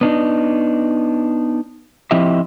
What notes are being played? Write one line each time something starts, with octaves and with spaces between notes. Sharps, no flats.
B3 D4 D#4
F3 C4 E4 G4 D#5 E5